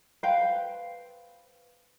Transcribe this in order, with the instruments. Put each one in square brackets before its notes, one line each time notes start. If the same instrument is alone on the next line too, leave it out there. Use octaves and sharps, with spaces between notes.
[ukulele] B4 C5 F5 G5